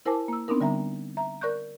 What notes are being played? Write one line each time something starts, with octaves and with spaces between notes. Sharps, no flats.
E4 A#4 C5 G#5 A5 D6
A#3 E6
B3 C4 D4 D#4 A#4
D3 G3 E5 A#5
E5 A#5
A#4 D5 C#6 F#6 G6